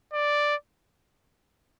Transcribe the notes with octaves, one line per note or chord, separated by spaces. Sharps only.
D5